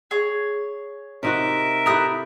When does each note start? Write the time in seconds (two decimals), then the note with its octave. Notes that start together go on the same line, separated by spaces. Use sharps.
0.11 G#4 C#5
1.23 C3 D#4 F#4 A#4 E5
1.86 E4 G4 A4 A#5 D#6 F#6